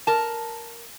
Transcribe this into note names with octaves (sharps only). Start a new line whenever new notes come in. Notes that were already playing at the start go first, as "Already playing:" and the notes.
A#4 A5